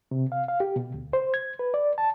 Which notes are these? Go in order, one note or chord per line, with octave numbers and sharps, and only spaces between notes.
C3
F5
F5
G4
B2
D2
C5
G#6
B4
D5
A5